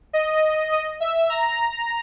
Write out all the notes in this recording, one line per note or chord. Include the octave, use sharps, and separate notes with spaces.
D#5
D#5
E5
A#5